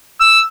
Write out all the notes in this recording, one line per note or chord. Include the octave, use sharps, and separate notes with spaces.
E6